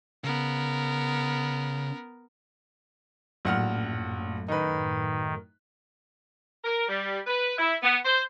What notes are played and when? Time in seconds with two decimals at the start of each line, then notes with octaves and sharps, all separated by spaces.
0.24 C#3 B3 A#4
3.45 A#1 F#2 A2 F#5 F6
4.48 D#3 D#4 B4
6.64 A#4
6.89 G3
7.26 B4
7.59 E4
7.82 B3
8.05 C5